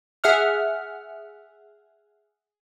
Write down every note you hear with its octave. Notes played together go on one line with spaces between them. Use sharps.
G#4 E5 F#5 F6